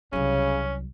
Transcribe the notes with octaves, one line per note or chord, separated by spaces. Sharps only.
C2 C#3 F#3 C#4